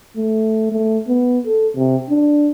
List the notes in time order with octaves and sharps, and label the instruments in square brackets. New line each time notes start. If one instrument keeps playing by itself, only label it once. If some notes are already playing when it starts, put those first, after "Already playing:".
[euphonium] A3
A3
B3
A4
C3
D4